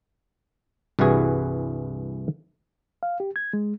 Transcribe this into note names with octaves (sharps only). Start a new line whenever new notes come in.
C2 G2 E3 F#4 G#4
F5
G4
G#6
G#3